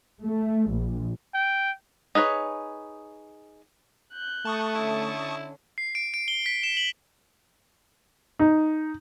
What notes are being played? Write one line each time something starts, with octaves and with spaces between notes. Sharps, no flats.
A3
A#1
G5
D#4 G#4 B4 C#5
F#6 G6
A3 A5 C#6 D#6
D3 C#4 E4
C7
D7
D7
G7
B6
E7
F#7
D#4